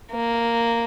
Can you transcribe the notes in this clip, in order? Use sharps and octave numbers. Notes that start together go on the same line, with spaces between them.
A#3